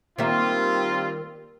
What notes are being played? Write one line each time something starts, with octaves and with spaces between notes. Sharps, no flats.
D#3 G3 A#3 C4 F4 E5